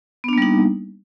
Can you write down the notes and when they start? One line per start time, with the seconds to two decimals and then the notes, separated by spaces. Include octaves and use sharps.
0.24 B3
0.28 D4
0.33 A#3
0.38 G3
0.42 D#4